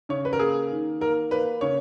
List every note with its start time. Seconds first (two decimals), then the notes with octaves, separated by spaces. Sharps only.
0.09 C#3 C#5
0.25 B4
0.33 A#4
0.39 A#3 G#4
0.70 D#3
1.01 A#3 A#4
1.31 A#3 B4
1.61 C#3 C#5